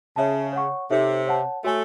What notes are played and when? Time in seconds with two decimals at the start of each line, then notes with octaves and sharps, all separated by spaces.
0.16 C#3 C#5 E5 A5
0.53 C#5 F#5 C#6
0.90 C3 D#4 A4 C#5 E5
1.27 C#5 F#5 A5
1.64 A3 F#4 A4 C#5 G#5